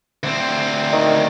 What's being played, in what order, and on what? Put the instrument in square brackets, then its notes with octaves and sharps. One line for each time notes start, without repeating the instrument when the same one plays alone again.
[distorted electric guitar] D2 C4
[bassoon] D#3